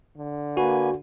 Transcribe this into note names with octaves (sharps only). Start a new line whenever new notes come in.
D3
A#3 F#4 B4 G#5